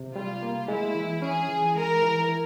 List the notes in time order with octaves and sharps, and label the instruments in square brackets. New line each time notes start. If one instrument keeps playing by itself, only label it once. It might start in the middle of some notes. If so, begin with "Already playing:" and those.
Already playing: [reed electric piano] C3
[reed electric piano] G3 [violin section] F4
[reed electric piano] A#3
[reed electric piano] G#3 [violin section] E4
[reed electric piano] E3
[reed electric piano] C#4 [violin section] G#4
[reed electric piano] E3
[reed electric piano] G#3 [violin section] A#4
[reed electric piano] E3
E4